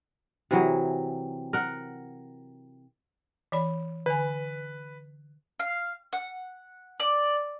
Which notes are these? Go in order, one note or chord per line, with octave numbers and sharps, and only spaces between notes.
C3 E3 F#3 G#4
A#4 F#5
E3 D5 B5
D3 B4 G#5
F5
F#5
D5